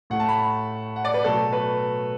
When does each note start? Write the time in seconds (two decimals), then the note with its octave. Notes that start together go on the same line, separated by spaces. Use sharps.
0.10 A2 A3 F#5
0.20 A5
0.29 B5
0.96 F#5
1.05 D5
1.14 B4
1.24 B2 F#3 A3 A4
1.52 B4